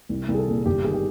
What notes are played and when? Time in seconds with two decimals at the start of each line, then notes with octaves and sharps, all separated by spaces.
0.09 C2
0.28 C2
0.34 G#4
0.38 A4
0.48 A#2
0.66 G1 G4
0.85 D#3 G#4
0.94 G4